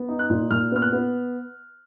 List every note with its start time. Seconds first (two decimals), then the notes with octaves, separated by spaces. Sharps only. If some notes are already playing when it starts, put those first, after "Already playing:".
Already playing: B3
0.08 D#4
0.19 F#6
0.30 A#2
0.51 A#2 F6
0.72 B3 F6
0.82 F#6
0.92 B3